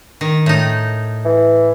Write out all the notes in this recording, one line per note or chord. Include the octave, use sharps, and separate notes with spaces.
D#3
A2 D#4
E3